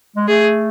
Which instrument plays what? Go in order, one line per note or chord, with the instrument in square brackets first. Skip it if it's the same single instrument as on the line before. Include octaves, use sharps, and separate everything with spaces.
[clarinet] G#3
[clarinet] A3 [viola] G#4